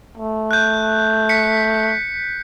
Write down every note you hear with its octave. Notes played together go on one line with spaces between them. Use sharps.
A3
F#6 G6
B6 C#7